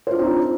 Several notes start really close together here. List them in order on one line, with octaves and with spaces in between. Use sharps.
C5 F4 D4 C4 D#4